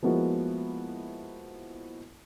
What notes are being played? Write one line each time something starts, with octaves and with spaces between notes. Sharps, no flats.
F3 G#3 A#3 B3 E4 F#4